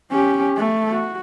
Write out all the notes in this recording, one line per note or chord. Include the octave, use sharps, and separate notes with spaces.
C#4 G4
A3
F#4